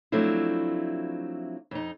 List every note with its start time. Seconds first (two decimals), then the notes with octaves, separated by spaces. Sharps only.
0.12 F3 F#3 A3 C4 D4 E4
1.71 F2 D#4